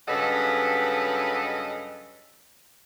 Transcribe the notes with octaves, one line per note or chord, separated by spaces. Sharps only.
G2 C#3 F#3 A4 B4 D#5